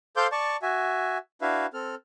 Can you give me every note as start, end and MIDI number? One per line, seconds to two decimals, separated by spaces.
0.16 0.27 69
0.16 0.27 72
0.16 0.27 77
0.16 0.27 84
0.16 0.27 86
0.16 0.27 91
0.32 0.57 74
0.32 0.57 81
0.32 0.57 85
0.62 1.18 66
0.62 1.18 76
0.62 1.18 80
1.42 1.66 62
1.42 1.66 64
1.42 1.66 66
1.42 1.66 71
1.42 1.66 76
1.42 1.66 77
1.74 1.95 60
1.74 1.95 69
1.74 1.95 89